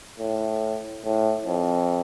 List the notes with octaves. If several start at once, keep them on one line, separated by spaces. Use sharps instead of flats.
A2
A2
F2